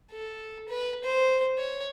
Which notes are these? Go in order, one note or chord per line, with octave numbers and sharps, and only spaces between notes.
A4
B4
C5
C#5